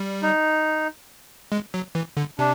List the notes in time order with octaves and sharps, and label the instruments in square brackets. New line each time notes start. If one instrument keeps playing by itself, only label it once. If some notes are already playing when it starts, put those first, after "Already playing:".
Already playing: [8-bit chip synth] G3
[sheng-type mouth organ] D#4
[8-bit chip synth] G#3
F#3
E3
D3
[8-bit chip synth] C3 [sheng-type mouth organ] D4